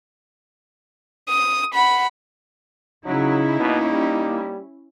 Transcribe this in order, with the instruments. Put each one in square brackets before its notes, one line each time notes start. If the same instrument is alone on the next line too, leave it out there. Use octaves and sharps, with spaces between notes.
[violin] D#6
F#5 B5
[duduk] C#3 [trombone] F#3 [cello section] C#4 E4 [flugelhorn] D#4
[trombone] B2 [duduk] A#3
[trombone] G3